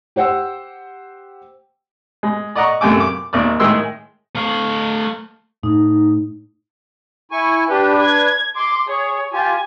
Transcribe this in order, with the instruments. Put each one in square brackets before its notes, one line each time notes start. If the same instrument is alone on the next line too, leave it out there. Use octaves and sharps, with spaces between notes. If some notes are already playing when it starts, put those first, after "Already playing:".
[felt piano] G4 C5 F#5 G5 E6
[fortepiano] G#3
D5 D#5 F#5 A#5 C#6
F#2 C3 A3 G5 G#5 D6
D6
G#1 D#2 D5
A2 D#3 G#3 G#4 C6 E6
[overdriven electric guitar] A3 F5
[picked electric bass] A2 [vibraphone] D#4
[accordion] E4 G#5 C#6
[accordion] D4 B4 [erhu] G4
[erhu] G#6
[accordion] C6 [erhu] D6
[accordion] G#4 [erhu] C#5
[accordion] F4 G4 [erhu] G#5